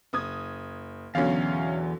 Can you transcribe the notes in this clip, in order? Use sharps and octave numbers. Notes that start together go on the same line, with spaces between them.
F#1 D#6 G#6
E2 B2 D3 F#3 C#4 F5